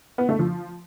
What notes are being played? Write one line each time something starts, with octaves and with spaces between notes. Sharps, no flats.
B3
A3
F3